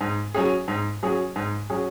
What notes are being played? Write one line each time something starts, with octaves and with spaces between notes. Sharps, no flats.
G#2
F#3 C#4 G#4
G#2
F#3 C#4 G#4
G#2
F#3 C#4 G#4